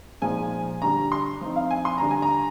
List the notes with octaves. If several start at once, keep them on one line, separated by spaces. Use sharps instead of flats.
A#2 F3 G#3 D#4 G#5
D3 G3 D4 A#5
C6
F3 C4 D#4
F5
G#5
C6
D3 G3 D4 A#5
G#5
A#5